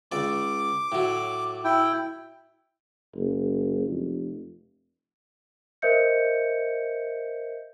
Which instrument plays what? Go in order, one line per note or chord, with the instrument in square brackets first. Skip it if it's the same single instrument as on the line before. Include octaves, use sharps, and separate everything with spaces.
[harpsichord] C#2 D5 [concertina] D6
[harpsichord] A2 F#3
[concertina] E4 G5
[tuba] F#1
F1
[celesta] A#4 C5 D#5 E5 G6 C#7